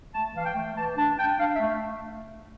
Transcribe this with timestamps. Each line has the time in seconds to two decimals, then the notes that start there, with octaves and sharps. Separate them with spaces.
0.12 A3 A5
0.34 E3 F5
0.44 G5
0.54 A3
0.75 E3 A5
0.97 D4 A5
1.18 D4 G5
1.38 D4 F5
1.54 E5
1.60 A3